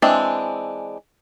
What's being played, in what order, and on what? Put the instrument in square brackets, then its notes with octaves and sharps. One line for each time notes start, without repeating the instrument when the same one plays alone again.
[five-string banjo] E3 G#3 C4 D4